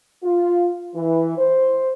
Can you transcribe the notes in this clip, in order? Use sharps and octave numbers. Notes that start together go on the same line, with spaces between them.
F4
E3
C5